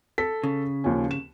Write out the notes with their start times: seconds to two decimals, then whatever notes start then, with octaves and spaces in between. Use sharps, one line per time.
0.18 A4 B6
0.43 C#3
0.84 D#2 F3 C#4
1.11 E7